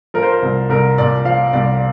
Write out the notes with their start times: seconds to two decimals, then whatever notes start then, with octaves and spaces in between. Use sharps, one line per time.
0.14 F3 A#4
0.23 C5
0.32 A#4
0.42 C2
0.69 C2 A#4
0.98 A#2 D5
1.25 F3 F5
1.53 C2 D5